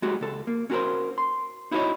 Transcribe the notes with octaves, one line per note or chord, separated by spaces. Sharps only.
G#3 A3 F#4 G4
C#2 A4
A#3
C#4 F#4 G4 A#4 C5
C6
D#4 E4 F#4 G#4 C#5 D#5